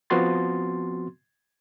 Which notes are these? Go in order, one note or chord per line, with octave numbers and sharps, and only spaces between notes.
F3 B3 C4 F#4 C6 A6